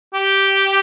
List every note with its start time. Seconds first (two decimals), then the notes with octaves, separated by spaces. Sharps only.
0.14 G4